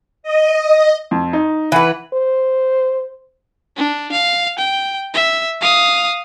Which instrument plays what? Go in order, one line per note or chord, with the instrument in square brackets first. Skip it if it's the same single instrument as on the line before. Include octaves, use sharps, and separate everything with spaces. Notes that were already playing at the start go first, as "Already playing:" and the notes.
[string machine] D#5
[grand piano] F2
D#4
[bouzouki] E3 B4 [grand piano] E5 F#5
[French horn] C5
[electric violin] D4
F5
G5
E5
F5 D#6